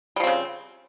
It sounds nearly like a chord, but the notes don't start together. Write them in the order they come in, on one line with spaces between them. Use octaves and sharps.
G3 F3 C4 C#3